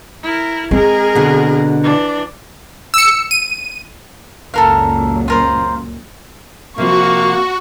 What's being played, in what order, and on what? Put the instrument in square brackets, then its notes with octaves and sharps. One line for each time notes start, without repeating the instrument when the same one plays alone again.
[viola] E4 A#4
[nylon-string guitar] G#3 [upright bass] C4 [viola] G#4 A#4
[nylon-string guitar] B2 D3
[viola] E3 D4
[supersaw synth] E6 C#7
D#7
[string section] C#2 F#2 A#2 [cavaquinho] A4 A#4 F5
[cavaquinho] F4 A#4 C5
[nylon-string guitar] C3 F3 C4 [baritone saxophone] A#3 [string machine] F#4 [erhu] C#6